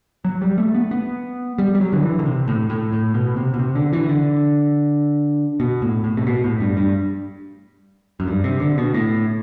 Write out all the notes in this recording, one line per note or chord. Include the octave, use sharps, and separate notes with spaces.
F#3
G3
A3
B3
B3
G3
G3
F#3
D3
E3
D3
C3
A2
A2
A2
B2
C3
B2
C3
D3
E3
D3
B2
A2
A2
C3
B2
A2
G2
G2
F#2
G2
C3
D3
B2
A2